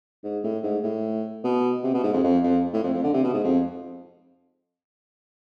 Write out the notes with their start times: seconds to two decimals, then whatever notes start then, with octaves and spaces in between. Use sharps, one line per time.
0.24 G#2
0.44 A2
0.63 G#2
0.83 A2
1.44 B2
1.83 C3
1.94 B2
2.03 G#2
2.13 F2
2.23 F2
2.44 F2
2.73 A2
2.84 F2
2.94 F2
3.04 D3
3.14 C3
3.23 B2
3.34 G#2
3.44 F2